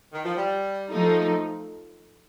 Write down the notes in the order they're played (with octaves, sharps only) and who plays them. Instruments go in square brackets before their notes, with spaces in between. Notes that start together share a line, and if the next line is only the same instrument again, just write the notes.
[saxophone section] D#3
F3
G3
[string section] F3 A3 D#4